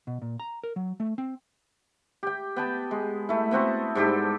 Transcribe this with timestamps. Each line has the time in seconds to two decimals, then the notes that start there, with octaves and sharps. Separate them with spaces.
0.07 B2
0.22 A#2
0.40 A#5
0.64 A#4
0.76 F#3
1.00 A3
1.18 C4
2.23 G4 G5
2.56 B3 G5 A5
2.91 G#3
3.29 A3 E4
3.51 B3 C4 F#4 A4
3.95 G#2 G3 G4 A4